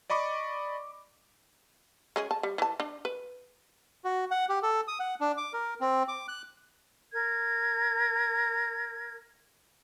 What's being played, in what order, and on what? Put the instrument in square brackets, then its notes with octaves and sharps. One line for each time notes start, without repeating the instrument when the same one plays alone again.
[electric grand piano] D5 D#5 B5 C#6 D6
[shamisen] G#3 C#4 G#4
A5
G3
E3 A5
D4
B4
[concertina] F#4
F#5
G4
A4
D#6
F#5
D4
D6
A#4
C4
D6
F#6
[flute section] A#4 G#6